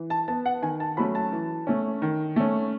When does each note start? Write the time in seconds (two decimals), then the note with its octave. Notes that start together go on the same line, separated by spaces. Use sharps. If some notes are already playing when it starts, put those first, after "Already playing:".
Already playing: E3
0.10 A5
0.28 B3 A5
0.46 F#5
0.62 D#3 G#5
0.80 A5
0.97 F#3 A3 C#4 B5
1.15 A5
1.32 E3
1.67 A3 C#4
2.02 D#3
2.36 A3 C#4